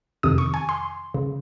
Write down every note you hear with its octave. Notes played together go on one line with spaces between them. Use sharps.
F2 C3 D#3 D#6
C#6
G#5
C6
C#3